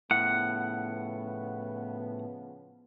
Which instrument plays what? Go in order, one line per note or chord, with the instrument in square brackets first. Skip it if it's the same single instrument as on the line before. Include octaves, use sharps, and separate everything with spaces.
[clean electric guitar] A2 [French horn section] C#3 F3 B3 [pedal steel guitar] F#5